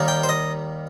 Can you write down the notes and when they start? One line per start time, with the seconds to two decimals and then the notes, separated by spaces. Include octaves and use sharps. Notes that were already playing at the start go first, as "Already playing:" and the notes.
Already playing: D#2 D#3 G3 A#3
0.08 G5
0.23 C5
0.29 D#5